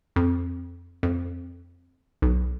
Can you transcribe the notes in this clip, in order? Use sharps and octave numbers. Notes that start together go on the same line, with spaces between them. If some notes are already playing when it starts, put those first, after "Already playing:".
F2
F2
B1